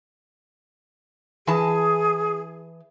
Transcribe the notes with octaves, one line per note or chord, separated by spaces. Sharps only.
E3 G#4 A5